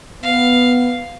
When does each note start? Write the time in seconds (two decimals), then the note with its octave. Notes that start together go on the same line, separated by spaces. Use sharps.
0.23 B3 F5